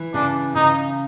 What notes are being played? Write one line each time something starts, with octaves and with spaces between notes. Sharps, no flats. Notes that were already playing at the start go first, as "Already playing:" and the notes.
Already playing: E3
C#3 D4
C#3 D#4